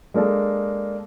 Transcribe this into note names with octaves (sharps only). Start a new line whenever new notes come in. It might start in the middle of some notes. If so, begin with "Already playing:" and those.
G#3 A#3 D4 A4